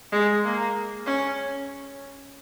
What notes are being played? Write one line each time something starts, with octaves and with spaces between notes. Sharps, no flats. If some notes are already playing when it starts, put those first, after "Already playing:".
G#3
A#3
C#4